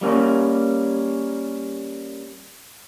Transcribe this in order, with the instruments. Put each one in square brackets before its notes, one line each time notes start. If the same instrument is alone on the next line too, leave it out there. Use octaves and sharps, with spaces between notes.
[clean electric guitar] G3 A#3 C#4